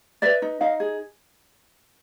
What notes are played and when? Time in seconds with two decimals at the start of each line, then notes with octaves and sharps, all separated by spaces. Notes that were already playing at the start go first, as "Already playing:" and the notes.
0.22 B4 D5 E5
0.42 D#4
0.61 D#4 D#5 F5
0.80 G#4